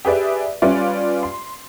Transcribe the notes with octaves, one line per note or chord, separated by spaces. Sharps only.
G4 G#4 B4 D5 E5
G3 C#4 F4 B4 D5 F5
C6